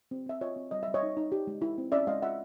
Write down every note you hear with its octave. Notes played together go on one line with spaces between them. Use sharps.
C4
C4 E5
F4 C#5 D#5
C4
G3 D#5
G3 E5
C#5 D#5
D#4
D#4
G4
G#3
E4
C4
C#4 D5 E5
G#3 D#5 F5
F4 E5 F#5